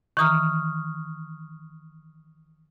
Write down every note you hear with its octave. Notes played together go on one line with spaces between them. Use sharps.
D#3 E3 A#5 C#6 D#6 F6